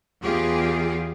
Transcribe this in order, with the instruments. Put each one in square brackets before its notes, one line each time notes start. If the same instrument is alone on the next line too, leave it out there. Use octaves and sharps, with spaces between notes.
[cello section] E2 F4 G4 G#4